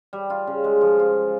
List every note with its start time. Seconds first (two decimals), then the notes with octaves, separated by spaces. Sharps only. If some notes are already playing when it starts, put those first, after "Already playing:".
0.13 G3
0.30 F4
0.47 C#3
0.64 G#3
0.81 F3
0.99 F4